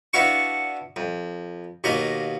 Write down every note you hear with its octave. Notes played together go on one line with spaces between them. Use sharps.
B3 D4 E4 F#4 F5 C#6
F2
D#2 B2 A#3 D#5 A#5